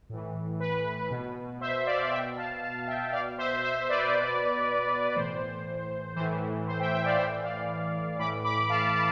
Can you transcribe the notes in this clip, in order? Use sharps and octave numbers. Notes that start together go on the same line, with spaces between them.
A2 E3
B4
B2
C5 E5
D5 F5
B2 E5 G5
F5 A5
F5 A5
E5 G5
B2 D5 F5
C5 E5
C5 E5
B4 D5
B2
A2 E3 C5
A2 E3 C5
C5
E5 G5
E5 G5
D5 F5
A2 E3 C5 E5
D5 F5
A2 E3 B5 D6
B5 D6
F5 A5
F5 A5